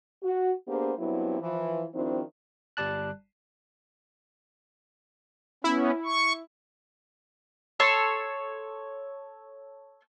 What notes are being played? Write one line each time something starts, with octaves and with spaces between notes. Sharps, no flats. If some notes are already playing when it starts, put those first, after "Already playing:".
F#4
A#3 B3 D4 G4 G#4 C5
G2 F#3 B3 C4 E4
E3 F3
D#3 F3 C4 D4 E4 F#4
G1 G3 D5 A5 F#6
B3 C#4 E4
C#6
A4 C#5 C6